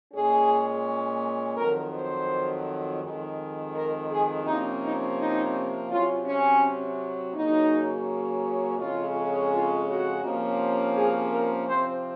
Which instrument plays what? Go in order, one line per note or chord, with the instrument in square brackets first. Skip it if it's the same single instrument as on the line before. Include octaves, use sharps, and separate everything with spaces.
[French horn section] A#2 G#3 C#4 G#4
F2 D#3 F#3 A#4
C5
F2 D#3 G#3
A#4
G#4
C3 F3 A#3 C#4 D#4
D#4
D#4
C3 F#3 C#4 F4
C#4
C#3 F#3 A#3 C#4 D#4
F2 C#3 G#3 C#4 F4
F4
F#4
C3 F3 A#3 C#4
G#4
A#4
C3 F3 C4 C5